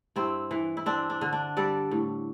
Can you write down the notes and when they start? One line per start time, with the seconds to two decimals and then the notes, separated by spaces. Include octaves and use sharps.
0.16 G2 C4 E4
0.51 E3
0.77 E4
0.86 C4 D4
1.10 D4
1.21 D3
1.33 D4
1.57 G3 A4 D5
1.91 A2